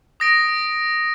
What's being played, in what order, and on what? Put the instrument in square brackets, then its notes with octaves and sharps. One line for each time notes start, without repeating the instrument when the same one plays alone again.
[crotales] D#6 A#6 D7